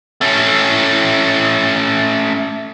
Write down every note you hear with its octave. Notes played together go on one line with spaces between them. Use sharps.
A3 C#4